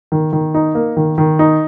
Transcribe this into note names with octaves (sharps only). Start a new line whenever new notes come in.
D#3
D#3
D#4
A#3
D#3
D#3
D#4